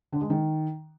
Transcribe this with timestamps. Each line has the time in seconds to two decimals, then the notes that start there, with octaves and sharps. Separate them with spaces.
0.12 D3
0.21 G#3
0.30 D#3